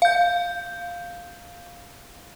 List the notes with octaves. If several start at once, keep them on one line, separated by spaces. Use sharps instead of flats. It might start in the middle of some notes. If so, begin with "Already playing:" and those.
F5 G6